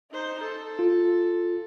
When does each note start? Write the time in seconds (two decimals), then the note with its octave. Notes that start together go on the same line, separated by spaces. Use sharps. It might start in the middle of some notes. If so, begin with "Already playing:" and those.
0.11 D#4 C5
0.44 A4
0.79 F4